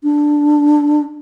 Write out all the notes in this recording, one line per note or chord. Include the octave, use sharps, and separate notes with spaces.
D4